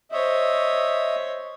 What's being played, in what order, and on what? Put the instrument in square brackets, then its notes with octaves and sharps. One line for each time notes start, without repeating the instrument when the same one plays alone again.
[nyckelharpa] C5 C#5 [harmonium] D#5 E5